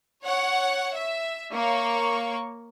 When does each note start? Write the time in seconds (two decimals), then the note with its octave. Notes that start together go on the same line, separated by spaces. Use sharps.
0.24 C#5 F#5
0.95 E5
1.52 A#3 C#5 C#6